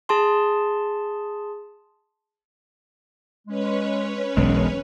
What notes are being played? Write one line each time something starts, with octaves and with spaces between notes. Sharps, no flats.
G#4 A5 C6
G#3 C#4 B4 C#5
E1 B1 G#3